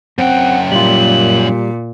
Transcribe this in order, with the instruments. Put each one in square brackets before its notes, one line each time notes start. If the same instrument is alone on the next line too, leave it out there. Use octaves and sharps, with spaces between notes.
[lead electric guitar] F#2 G5 [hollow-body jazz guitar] C4 [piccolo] F#5
[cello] A#2 [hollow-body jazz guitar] G3 F4 [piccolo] F#7